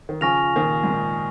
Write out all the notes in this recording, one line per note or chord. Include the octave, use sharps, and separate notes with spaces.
D#3
C#3 F3 G#5 C#6 F6 A#6 F7
A#2 D#3
G#2
A#2